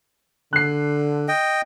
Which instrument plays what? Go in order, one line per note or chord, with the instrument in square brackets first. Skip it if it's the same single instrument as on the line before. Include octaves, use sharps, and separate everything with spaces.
[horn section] D3 [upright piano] F#6 C7
[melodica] D#5 G5